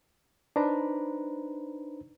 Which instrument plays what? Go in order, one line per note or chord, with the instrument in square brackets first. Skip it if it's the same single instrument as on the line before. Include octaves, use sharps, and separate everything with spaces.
[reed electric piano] D4 D#4 B4 C5 A#5 B5